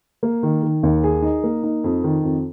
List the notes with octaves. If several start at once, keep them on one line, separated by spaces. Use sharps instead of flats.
A#3
D#3
D#3
D#2
G#4
D#4
A#3
D#4
F2
D#3
F2